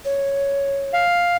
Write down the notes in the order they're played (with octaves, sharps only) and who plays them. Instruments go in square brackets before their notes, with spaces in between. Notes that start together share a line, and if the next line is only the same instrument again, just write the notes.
[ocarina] C#5
[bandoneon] F5